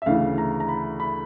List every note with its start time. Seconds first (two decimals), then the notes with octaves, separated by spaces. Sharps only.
0.02 E5
0.06 D2 C#3 E3 F5
0.38 A#5
0.60 A#5
0.68 B5
1.00 B5